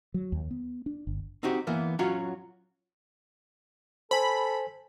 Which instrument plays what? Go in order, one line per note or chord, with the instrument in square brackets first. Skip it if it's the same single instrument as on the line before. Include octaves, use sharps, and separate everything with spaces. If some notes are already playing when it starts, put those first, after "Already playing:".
[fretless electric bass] F#3
D#2
B3
D4
G1
[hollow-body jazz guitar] C4 D#4 F#4 G4
E3 A#3 B3
F#3 C#4 F4 F#4 C#5
[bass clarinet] A4 [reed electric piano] C5 G#5 [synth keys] B5